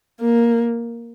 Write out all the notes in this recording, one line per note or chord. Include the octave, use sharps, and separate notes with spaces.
A#3